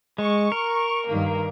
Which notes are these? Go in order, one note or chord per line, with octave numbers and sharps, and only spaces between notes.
G#3 C#6
A#4
G2 D#3 A#3